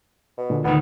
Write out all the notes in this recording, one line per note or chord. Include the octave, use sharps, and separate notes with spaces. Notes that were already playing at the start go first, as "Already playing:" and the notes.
B2
A#2 D3
D2 D#3 B3